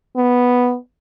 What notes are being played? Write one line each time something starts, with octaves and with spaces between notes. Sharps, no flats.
B3